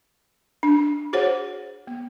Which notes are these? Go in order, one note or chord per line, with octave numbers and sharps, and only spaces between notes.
D4
F#4 G#4 C5 C#5 F#5
B3